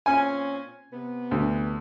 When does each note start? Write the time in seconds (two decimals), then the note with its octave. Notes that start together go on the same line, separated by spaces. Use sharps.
0.06 A#2 C4 C#4 G#5
0.92 C3 B3
1.31 D2